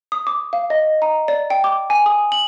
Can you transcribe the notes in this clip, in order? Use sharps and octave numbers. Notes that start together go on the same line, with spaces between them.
D#6
D6
F5
D#5
A#5
D5
G5
D6
G#5
D#6
F#7